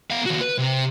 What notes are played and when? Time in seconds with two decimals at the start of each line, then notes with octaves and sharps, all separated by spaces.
0.10 B3 F5
0.26 D#2 F#4
0.41 B4
0.58 C3